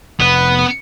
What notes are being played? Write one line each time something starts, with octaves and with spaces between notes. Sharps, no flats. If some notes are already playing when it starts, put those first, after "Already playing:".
F1 B3 B4